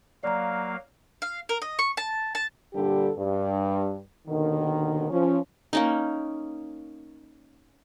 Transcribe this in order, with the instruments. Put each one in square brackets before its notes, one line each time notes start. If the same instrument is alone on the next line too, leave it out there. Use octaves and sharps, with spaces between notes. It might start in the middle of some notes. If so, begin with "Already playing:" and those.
[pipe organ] F#3 A#3 F5 [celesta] D5 A#5
[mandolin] F5
A#4
D#5
C#6
A5
A5
[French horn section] G2 A#2 D3 G3 G4 A4
G2
D#2 B2 D3 D#3
F3 C#4
[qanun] A#3 C#4 D#4